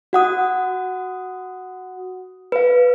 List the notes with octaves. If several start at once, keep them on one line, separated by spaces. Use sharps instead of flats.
F#4 F#5 D#6
B4 F5